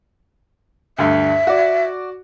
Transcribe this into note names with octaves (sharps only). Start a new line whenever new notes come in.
D2 G2 E5
F#4 D5